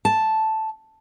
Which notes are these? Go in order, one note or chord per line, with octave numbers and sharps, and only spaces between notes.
A5